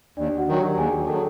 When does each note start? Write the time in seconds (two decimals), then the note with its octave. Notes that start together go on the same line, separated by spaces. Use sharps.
0.17 D#2 D4 D5
0.37 F#4 F#5
0.48 D#3 F#3
0.57 G4 G5
0.77 D#2 G#4 G#5
0.92 G4 G5
1.07 D#3 F#3 A4 A5